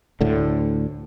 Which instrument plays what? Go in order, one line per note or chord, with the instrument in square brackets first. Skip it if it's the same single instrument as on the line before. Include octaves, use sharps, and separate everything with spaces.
[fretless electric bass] D2 A2 D3